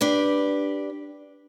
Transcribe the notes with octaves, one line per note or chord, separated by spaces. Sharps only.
D4 G4 B4